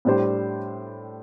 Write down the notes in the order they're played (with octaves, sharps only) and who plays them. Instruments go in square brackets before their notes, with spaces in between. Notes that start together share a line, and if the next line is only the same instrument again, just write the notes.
[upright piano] A2 G3 D4 G4 C5